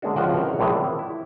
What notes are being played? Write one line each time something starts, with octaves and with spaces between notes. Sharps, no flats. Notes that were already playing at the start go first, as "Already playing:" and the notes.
D3 G#3 A#3 C#4 D4 F#4
C#2 F3 C4 F#4 F#5 G5
C4 C#4 E4 F#4 A#4 B4
A#1 A2 D3 E3 G#3 A4
C4
E4